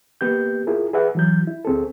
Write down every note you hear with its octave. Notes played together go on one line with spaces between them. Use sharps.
A#3 B3 G4 G6
E4 F4 G#4 A#4
G#4 B4 E5 F#5
E3 F#3 G6
E4
D2 C4 G#4 A4